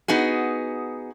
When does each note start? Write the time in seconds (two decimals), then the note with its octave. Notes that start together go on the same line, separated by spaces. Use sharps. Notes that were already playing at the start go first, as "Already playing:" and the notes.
0.08 B3 D#4 F#4 G#4